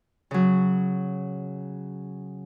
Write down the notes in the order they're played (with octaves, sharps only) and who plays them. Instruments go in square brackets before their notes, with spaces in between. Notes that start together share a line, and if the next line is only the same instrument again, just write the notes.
[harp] C#3 F#3